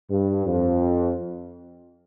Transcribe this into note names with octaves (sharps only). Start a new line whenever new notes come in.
G2
F2